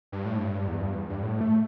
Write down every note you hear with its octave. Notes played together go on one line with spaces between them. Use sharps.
G2
A2
G2
E2
G2
E2
G2
A2
A3